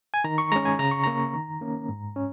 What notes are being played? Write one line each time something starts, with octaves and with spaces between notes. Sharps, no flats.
G#5
D#3 A#5
C#6
G#3 C#4 A#5
G#5
C#3 A#5
C#6
A#3 C#4 A#5
D#3
A#3 C#4
G#2
C#4